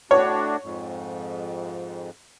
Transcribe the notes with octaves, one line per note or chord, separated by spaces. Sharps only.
A2 D4 F#4 C#5
F2 G#2